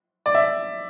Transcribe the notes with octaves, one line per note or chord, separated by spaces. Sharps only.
D5
E5